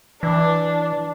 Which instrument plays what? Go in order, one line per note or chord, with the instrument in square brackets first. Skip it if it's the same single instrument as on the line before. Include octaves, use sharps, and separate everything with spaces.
[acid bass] E3 [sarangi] D4